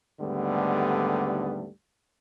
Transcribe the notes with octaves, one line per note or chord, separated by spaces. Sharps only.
D#2 G#2 D3 G3 A3 B3